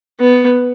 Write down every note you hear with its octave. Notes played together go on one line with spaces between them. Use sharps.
B3